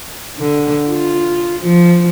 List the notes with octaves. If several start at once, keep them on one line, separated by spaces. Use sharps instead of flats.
D3
F4
F3